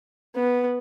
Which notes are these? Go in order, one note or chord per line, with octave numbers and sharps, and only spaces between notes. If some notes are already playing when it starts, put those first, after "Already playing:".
B3